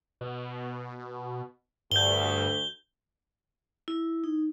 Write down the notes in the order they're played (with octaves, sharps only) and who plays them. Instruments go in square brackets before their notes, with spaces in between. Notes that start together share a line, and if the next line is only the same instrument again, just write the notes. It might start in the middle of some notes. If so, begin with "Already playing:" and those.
[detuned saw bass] B2
[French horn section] D2 [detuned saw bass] G2 [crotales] G6 G7
[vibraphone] E4
D#4